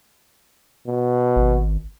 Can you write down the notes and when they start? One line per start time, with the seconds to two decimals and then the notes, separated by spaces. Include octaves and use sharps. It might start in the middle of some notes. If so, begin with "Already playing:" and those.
0.86 B2
1.36 G#1